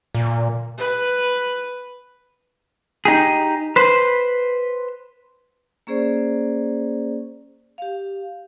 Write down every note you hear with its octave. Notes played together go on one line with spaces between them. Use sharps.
A#2
B4
D#4 G4 G#4
B4 C5
A#3 C#4 G#4 C5 D5
G4 F5